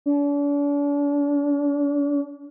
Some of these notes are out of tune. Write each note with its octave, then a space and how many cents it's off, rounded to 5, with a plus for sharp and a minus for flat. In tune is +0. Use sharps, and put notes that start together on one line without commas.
D4 -40